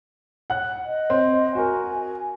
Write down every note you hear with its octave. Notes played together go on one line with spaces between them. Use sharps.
F#5 F#6
D#5
C4
F#4 A#4 G#5